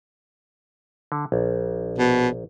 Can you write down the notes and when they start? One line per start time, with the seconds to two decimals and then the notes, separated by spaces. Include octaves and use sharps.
1.12 D3
1.32 A#1
1.98 B2